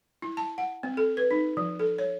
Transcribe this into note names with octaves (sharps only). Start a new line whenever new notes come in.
E4
A5
F#5
C4
A4
B4
D#4
F3
A4
C#5